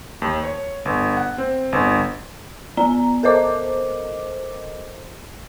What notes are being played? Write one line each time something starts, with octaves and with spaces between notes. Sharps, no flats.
D#2
C#5
G1
F#5
C4
G1
B3 D5 A#5
A4 A#4 C5 D#5 D6